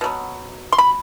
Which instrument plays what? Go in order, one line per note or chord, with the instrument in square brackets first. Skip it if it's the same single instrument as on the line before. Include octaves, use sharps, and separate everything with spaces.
[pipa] B2 F#3 B3
C6
B5